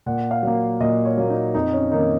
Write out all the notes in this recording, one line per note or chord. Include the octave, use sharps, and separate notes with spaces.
A#2 F#5
F5
F#3 A#3
A#2 D#5
C#5
F#3 A#3
D#4
F2 D#4
C#4
D#3 A#3 D#4